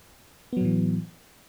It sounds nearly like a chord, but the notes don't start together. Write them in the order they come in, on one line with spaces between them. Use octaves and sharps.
B3 F#3 A2 E3